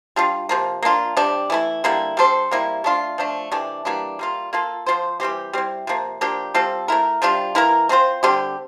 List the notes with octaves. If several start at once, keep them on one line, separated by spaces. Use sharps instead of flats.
G3 D4 F4
C3 F3 A#3
A#3 D4 F4
C3 G3 D4
E3 A3 E4
D3 G3 A#3 E4
G3 D4 A4 C5
C3 G3 A#3 E4
A3 D4 F4
F3 A3 D4
C3 E3 A3 D4
E3 G3 A#3 D4
G3 A#3 F4
A#3 F4 A4
F3 C4 F4 C5
E3 G3 C4 G4
G3 C4 E4
C3 F3 A#3
F3 A#3 D4 G4
G3 C4 F4 A4
A3 E4 A#4
C3 G3 D4 F4
E3 A#3 E4 A#4
A3 C4 F4 C5
D3 G3 C4 G4